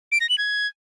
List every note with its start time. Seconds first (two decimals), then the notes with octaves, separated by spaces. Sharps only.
0.12 D7
0.21 A#6
0.29 F#7
0.38 G#6